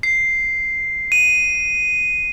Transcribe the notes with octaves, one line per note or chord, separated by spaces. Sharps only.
C7
D#7